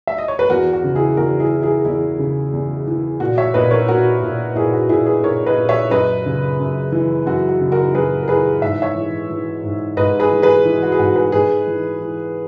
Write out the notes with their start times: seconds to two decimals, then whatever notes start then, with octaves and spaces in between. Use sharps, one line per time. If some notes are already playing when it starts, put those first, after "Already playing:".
0.07 E5
0.18 D#5
0.28 C#5
0.39 B4
0.49 E2 F#4 A#4
0.73 F#4
0.84 C#3
0.96 E4 G#4
1.17 E2 F#4 A#4
1.40 E4 G#4
1.51 E3
1.62 E4 G#4
1.85 E2 E4
2.19 C#3
2.53 E2
2.87 E3
3.20 A#2 F#4
3.38 C#5 E5
3.54 A#2 B4 D#5
3.71 A#4 C#5
3.88 A#2 F#4 A#4
4.23 A#2
4.55 A#2 E4 G#4
4.73 F#4
4.89 A#2 E4 G#4
5.06 G#4 B4
5.23 A#2 A#4 C#5
5.46 B4 D#5
5.57 A#2
5.69 C#5 E5
5.91 F#2 B4 D#5
6.26 C#3
6.60 F#2
6.92 E3
7.26 F#2 F#4
7.49 F#4
7.61 C#3
7.72 F#4 A#4
7.95 F#2 G#4 B4
8.23 A#4
8.28 E3 G#4 B4
8.62 G#2 E5
8.82 C#5 E5
8.95 E3
9.30 E3
9.64 G#2
9.97 G#2 B4 D#5
10.20 G#4 B4
10.31 E3
10.42 G#4 B4
10.65 E3
10.83 F#4
10.92 G#4
10.99 G#2 F#4
11.15 G#4 B4
11.32 G#2 G#4 B4
11.67 E3
12.01 E3